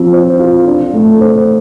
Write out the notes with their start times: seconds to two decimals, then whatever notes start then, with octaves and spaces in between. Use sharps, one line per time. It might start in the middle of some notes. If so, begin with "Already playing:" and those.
Already playing: F3 C4
0.13 C5
0.39 F4
0.67 D4
0.93 A3
1.20 C5